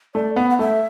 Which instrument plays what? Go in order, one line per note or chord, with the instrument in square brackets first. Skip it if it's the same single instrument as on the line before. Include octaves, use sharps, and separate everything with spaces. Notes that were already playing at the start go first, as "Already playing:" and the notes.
[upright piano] A3 [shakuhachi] D5
[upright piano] B3 [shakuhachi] F#5
[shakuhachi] F#5
[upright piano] A3 [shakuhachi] E5